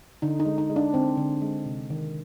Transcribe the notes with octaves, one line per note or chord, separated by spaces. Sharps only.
D3 D#4
D#4
G#3
D#4
G#3
D4
D3 C4
D3
G#3
C3
D#3